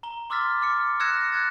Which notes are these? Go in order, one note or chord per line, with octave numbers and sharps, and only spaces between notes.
A#5 G7
C6 D6 E6 F6 A6 B6
D6 F6 C#7
E6 F#6 G#6 A#6 C#7 E7
E6 F#6 G#6 A6